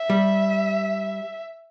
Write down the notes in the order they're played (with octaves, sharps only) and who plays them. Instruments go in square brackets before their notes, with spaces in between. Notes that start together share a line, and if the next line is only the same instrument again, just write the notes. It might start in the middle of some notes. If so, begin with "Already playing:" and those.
Already playing: [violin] E5
[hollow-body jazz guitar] G3